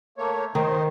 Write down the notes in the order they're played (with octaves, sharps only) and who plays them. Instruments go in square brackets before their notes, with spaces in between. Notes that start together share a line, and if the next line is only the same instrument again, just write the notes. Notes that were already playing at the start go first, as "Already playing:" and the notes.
[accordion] A3 A#3 C#5
[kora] D#3 [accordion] D#4 C5